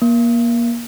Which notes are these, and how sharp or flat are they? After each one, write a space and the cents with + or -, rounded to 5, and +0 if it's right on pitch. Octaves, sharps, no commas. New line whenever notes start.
A#3 +25